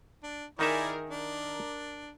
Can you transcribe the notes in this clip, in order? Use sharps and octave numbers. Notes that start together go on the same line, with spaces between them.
D4
D#3 D#4 E4 G#4 A#4 D5 E5
D4 A#4